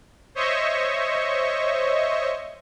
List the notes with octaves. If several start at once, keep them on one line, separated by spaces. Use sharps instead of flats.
C5 C#5 D#5 E5 C#6